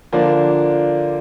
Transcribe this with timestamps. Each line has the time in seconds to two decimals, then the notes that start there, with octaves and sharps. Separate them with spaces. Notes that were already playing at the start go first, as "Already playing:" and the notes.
0.13 D3 F3 A#3 D4